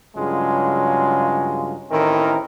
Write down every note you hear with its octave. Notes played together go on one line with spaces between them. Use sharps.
G2 C#3 F#3 G#3 F4
A1 A2 D#3 C4 E4 A#4